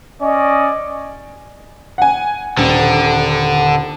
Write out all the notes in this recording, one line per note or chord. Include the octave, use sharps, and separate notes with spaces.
C#4 D5 D#5
F#5 G#5
D#1 D3